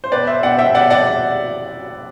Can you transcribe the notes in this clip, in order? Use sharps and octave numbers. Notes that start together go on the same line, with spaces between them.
C5
B2 B4 D5
C5 E5
B2 D5 F#5
E5 G5
B2 D5 F#5
D5 F#5